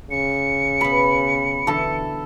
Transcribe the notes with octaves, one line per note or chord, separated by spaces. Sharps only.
C#3 C#7
B2 B3 B5
B2 D3 E3 A4 A5